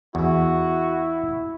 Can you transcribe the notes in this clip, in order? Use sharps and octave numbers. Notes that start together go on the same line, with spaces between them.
E2 E4 F#4